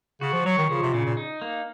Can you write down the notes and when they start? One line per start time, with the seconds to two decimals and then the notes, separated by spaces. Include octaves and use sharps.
0.21 C#3 F#4
0.33 F3
0.45 F#3 C#5
0.58 D#3
0.69 C#3 F3
0.82 C3
0.94 A#2 C#3
1.06 A#2
1.17 D#4
1.42 A#3